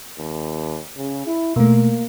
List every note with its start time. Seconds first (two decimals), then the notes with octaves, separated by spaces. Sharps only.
0.18 D#2
0.97 C#3
1.26 E4
1.56 B2 A3 A#3